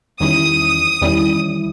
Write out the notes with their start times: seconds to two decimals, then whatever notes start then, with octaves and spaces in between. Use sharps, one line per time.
0.20 E2 D#3 G3 C#4 E4 D#6
1.02 E2 D#3 G3 C#4 E4